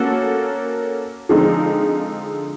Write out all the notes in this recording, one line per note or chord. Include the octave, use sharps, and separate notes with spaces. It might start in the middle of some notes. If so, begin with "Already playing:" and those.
Already playing: A#3 C#4 F#4 A4
D3 F3 G#3 C4 D#4